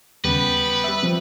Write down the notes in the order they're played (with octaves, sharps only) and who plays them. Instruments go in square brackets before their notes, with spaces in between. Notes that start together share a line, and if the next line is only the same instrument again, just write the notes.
[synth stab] D#2 C#3 [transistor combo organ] G3 B3 [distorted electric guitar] B4
[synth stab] E5
C3 F3 C4